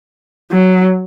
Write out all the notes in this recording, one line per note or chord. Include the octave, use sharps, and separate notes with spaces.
F#3